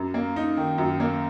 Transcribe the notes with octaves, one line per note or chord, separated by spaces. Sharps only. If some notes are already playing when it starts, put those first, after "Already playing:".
Already playing: F#2
A#3
D#4
D#3
F#2
A#3